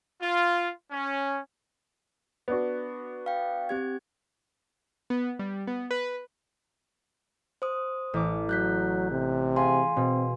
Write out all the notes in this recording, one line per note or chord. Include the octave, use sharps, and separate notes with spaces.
F4
C#4
B3 D4 F#4
F5 G5
C4 G4 G#6
B3
G3
B3
B4
C5 D#6
A1 D6
F#3 F#6 G6 B6
C3
G#4 F5 G#5 C6
B2 C4